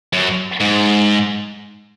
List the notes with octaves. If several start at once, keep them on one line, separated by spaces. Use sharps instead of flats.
F#2
G#2